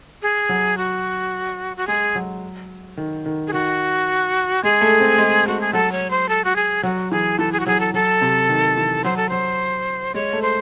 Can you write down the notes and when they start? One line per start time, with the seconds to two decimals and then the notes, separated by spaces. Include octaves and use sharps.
0.22 G#4
0.49 F#3
0.77 F#4
1.77 F#4
1.87 G#3 G#4
2.15 F#3
2.97 D#3
3.26 D#3
3.47 G#4
3.53 D#3 F#4
4.63 G#3 G#4
4.81 A3
5.00 C4
5.18 G#3
5.46 G#3 F#4
5.61 G#4
5.73 F#3 A4
5.92 C#5
6.10 C5
6.29 A4
6.44 F#4
6.56 G#4
6.83 F#3 F#4
7.11 E3 G#4
7.39 E3 A4
7.52 G#4
7.60 F#4
7.66 F#3 G#4
7.80 A4
7.94 F#3 A4
8.21 C3
8.49 D#3
8.77 E3
9.04 F#3 C5
9.17 A4
9.29 F#3 C5
10.14 G#3 C#5
10.33 A3
10.42 C5